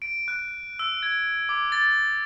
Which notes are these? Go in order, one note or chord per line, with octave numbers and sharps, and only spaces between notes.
D7
F#6
E6
G#6
D6
A6